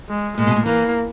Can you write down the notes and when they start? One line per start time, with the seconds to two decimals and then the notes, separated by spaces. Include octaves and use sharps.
0.09 G#3
0.37 A#2 G#3
0.47 B2
0.56 A#2
0.66 E3 A#3